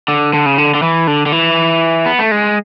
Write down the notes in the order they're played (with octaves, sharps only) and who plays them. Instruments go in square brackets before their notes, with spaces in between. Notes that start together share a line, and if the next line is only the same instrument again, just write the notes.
[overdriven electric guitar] D3
D3
C#3
D3
D3
E3
D3
D3
E3
B3
A3
G#3